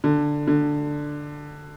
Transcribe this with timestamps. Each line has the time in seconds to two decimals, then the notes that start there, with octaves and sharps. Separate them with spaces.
0.04 D3
0.48 D3